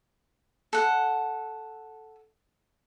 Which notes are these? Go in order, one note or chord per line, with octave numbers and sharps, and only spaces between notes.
A4 F#5